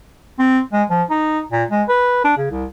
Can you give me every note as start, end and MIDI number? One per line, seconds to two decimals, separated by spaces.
0.39 0.61 60
0.73 0.84 56
0.90 1.03 53
1.10 1.40 63
1.52 1.64 46
1.71 1.83 56
1.88 2.24 71
2.24 2.33 62
2.37 2.47 49
2.51 2.66 36